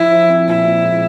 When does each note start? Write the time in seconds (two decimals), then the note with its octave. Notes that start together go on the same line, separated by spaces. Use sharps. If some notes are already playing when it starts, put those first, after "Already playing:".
Already playing: F3 E4
0.12 F3
0.30 C4
0.48 A#2 E4
0.65 A#2
0.84 G#3